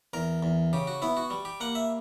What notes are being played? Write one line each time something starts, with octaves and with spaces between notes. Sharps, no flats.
E2 A#4
E2
C#3 G4
F#4
B3 E4
F#4
G3
G4
A#3 F#5
E5